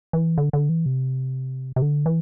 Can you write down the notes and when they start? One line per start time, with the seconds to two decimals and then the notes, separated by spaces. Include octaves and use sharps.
0.13 E3
0.38 D3
0.53 D3
0.69 E3
0.86 C3
1.76 C3
1.82 D3
2.06 E3